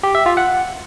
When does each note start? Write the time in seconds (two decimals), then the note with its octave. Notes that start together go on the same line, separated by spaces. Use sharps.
0.03 G4
0.15 E5
0.26 F4
0.37 F#5